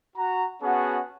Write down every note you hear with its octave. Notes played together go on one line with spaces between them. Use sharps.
F#4 A#5
B3 C#4 F#4 G#4 F#5 A5